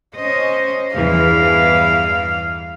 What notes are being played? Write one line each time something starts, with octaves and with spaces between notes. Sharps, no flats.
C#4 C5 D#5
E2 G2 E3 F5